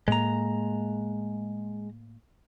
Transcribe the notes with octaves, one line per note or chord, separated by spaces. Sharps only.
A2 G#3 A#3 A#5